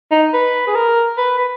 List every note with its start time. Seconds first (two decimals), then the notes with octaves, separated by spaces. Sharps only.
0.11 D#4
0.33 B4
0.67 G#4
0.75 A#4
1.17 B4
1.38 B4